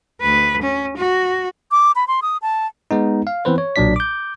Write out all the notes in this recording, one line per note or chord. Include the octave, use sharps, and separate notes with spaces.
D2 B4
C#4
F#4
D6
B5
C6
D#6
A5
G#3 B3 D#4
F5
E3 B3 C4 B4 C5
C#5
B1 A#2 F#3 D4 D5 B6
D6 G6